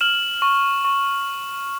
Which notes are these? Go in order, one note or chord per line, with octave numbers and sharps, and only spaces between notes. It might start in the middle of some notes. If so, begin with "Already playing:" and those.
F6 E7 F#7
C#6
C#6